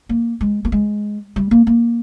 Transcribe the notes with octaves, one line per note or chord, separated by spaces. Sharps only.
A#3
G#3
A#3
G#3
G3
A#3
A#3